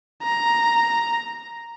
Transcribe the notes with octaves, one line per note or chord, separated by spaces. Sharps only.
A#5